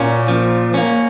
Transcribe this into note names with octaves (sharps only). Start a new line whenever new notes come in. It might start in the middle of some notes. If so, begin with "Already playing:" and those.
Already playing: A#2 A#3 C#4
F3
A#3 C#4